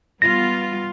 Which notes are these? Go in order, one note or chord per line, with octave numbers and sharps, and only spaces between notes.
G3 B3 F4 A#6